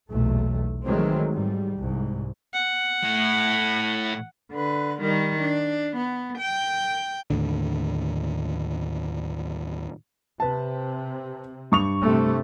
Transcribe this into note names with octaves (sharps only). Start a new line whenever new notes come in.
B1 E2 A#2 A3
D#3 E3 F#3 G#3 A3 C4
G#2 G3
C2 G#2
F#5
A2
D3 B4
D#3 G3
D4
B3
G5
D#2 A2 D3
C3 B4 A5
G2 C#6 F7
C3 A3